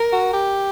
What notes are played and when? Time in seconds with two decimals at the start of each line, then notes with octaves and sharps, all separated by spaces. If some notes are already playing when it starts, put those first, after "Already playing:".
Already playing: A#4
0.12 F#4
0.33 G4